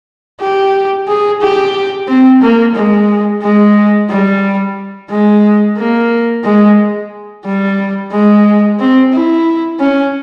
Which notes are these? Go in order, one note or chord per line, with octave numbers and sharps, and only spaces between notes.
G4
G#4
G4
C4
A#3
G#3
G#3
G3
G#3
A#3
G#3
G3
G#3
C4
E4
C#4